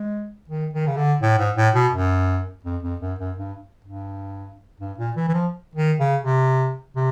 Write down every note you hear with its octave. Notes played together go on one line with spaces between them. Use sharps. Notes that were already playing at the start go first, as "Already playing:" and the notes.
Already playing: G#3
D#3
D#3
C#3
D3
A2
G#2
A2
B2
F#2
F2
F2
F#2
F#2
G2
G2
G2
A#2
E3
E3
F3
D#3
C#3
C3
C3